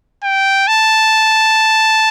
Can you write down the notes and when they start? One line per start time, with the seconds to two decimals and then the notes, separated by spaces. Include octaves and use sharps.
0.23 G5
0.67 A5